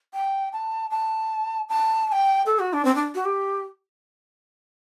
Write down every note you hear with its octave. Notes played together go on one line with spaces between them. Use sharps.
G5
A5
A5
A5
A5
G5
A4
F#4
D4
C4
D4
F#4
G4